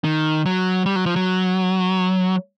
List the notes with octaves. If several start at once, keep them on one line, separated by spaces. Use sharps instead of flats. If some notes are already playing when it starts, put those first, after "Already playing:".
D#3
F#3
G3
F#3
F3
F#3